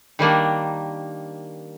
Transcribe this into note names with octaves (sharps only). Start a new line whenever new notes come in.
D#3 G3 A#3 D4